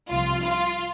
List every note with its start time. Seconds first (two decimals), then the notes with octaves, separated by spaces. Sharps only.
0.08 C2 C3 F3 F4
0.43 F4